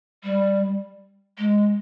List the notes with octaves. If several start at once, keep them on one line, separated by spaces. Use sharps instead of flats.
G3
G#3